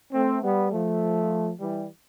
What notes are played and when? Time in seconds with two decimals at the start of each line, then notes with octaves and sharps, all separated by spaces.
0.13 A3 C4
0.43 G3 B3
0.71 F3 A3
1.60 E3 G3